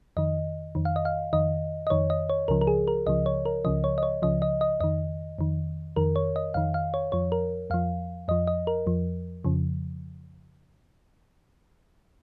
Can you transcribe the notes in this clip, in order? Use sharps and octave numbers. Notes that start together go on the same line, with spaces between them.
F2 D#3 D#5
F2 D#3
F5
D#5
F5
F2 D#3 D#5
D#5
F2 D#3 C#5
D#5
C#5
C#2 C#3 F3 A#4
A#4
G#4
A#4
C#2 C#3 F3 D#5
C#5
A#4
C#2 C#3 F3 D#5
C#5
D#5
C#5
C#2 C#3 F3 D#5
D#5
D#5
F2 D#3 D#5
F2 D#3
F2 D#3 A#4
C#5
D#5
F2 D#3 F5
F5
C#5
F2 F3 C#5
A#4
F2 F3 F5
F2 F3 D#5
D#5
A#4
F2 F3
F2 C#3 F3